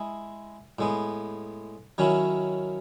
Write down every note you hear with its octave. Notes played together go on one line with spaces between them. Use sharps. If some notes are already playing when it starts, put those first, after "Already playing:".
Already playing: G#3 E4 G#4
A2 G#3 B3
D#3 F#3 C#4 E4